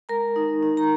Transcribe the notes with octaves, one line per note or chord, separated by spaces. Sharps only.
G#3 A#4 A#5
D#4
D#4
A#5